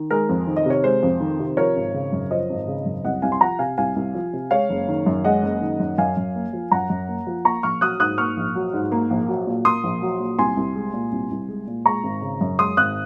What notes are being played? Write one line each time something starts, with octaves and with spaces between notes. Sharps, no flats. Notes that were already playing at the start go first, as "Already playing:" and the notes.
Already playing: D#3
G#3 A#4
F2
D#3
D#5
C3 C#5
G#3 C5
F2
D#3
C3
F3 A#4 C#5
G#1
C#3
F#2
F3 C5 D#5
G#1
C#3
F#2
C2 D#5 F#5
C2 F5 G#5
C6
F3 F#5 A#5
C3 F5 G#5
C2 F5 G#5
C2
F3
C3
G#3 C#5 F5
F#1
D#3
F#2
G#3 D#5 F#5
F#1
D#3
F#2
F#2 F5 G#5
F#2
A#3
F3
F#2 F#5 A#5
F#2
A#3
F3
A#3 A#5 C#6
A#1 C#6 F6
F#3 D#6 F#6
G#2 D#6 F#6
A#3 C#6 F6
A#1
F#3
G#2
A#3
A#1
F#3
A#2
A#3 C6 D#6
A#1
F#3
A#2
C2 G#5 C6
C2
G#3
A#2
C2
C2
G#3
A#2
G#3 A#5 C#6
G#1
C#3
F#2
G#3 C6 D#6
G#1 D#6 F#6